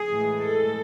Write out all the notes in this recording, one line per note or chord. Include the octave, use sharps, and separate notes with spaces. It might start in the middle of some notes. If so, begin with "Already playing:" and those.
Already playing: G#4
A2 E3 G#3
A4